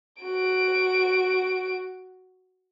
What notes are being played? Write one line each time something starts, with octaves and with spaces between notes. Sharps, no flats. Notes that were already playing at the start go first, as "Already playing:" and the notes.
F#4 D7